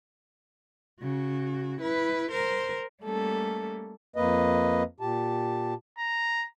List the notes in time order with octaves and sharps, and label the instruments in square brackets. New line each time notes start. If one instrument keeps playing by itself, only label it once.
[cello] C#3 F#4
E4 B4
A#4 C5
[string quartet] G3 A3 A#3 C#4 A4
[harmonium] F2 A#3 B4 D#5
A#2 G4 A5
[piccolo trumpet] A#5